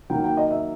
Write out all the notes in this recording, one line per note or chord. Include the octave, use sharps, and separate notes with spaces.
D#3 F#3 A#3 G5
G5
D#5
E5